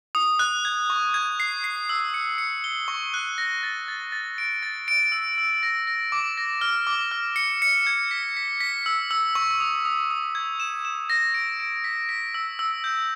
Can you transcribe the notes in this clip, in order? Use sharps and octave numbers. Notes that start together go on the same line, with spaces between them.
D#6
F#6
G#6
C#6
G#6
C7
C7
E6
C#7
C#7
G7
C#6
F#6
A#6
A6
A6
A6
D7
A6
D7
E6
E6
A#6
A#6
D6
A#6
F6
D6
F6
C#7
C#7
G#6
B6
B6
B6
E6
E6
C#6
D#6
D#6
D#6
G#6
E7
E7
A#6
D7
D7
B6
B6
E6
E6
G6